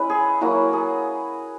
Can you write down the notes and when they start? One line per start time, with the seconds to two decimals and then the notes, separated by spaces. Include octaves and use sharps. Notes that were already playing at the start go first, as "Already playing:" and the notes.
Already playing: G#3 C#4 E4 B4
0.10 G#4
0.41 F#3 A#3 E4 F#4
0.73 G#4